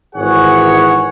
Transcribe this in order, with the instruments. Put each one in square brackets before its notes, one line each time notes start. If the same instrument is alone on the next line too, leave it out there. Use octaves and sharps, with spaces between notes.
[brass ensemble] G#1 G#2 E3 G#4 C#5 F#5